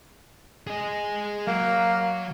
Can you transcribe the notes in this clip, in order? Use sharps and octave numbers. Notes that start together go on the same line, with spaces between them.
G#4 D#5
F#3 A#3